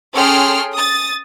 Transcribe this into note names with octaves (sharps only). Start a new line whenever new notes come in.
C#4 G#4 A4 G5 C6 F6
D#6 A6